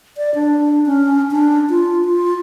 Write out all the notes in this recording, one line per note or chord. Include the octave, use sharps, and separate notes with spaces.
D5
D4
C#4
D4
F4
F4